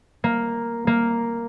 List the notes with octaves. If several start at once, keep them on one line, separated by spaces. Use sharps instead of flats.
A#3
A#3